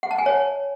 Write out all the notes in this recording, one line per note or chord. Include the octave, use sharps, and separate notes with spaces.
F#5
A5
G#5
C#5